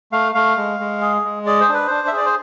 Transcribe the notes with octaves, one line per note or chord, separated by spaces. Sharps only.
A3 F5
A3 F5
G#3
G#3
G#4
G#3
G#4 D5
C5
D4 B4
D4 C5
E5
G#4 D5
C5